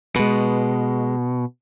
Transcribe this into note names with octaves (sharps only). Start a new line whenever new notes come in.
B2 G#3 B4